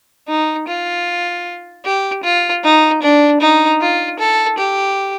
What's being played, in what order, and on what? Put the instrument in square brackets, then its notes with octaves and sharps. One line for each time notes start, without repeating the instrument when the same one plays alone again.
[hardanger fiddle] D#4
F4
G4
F4
D#4
D4
D#4
F4
A4
G4